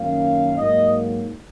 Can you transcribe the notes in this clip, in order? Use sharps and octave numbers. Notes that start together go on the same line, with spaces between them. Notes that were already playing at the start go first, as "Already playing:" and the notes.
Already playing: F#2 D#3 A#3 C#4 F5
G#2 F#3 A#3 D#5